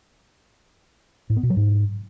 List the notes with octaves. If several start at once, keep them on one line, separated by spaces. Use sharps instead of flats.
A2
B3
B2
F#3
G#2